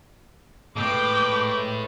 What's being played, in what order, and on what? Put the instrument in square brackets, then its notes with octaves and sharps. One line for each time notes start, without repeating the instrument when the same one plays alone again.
[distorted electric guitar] A2 [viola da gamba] G#3 B4 [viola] G5 D6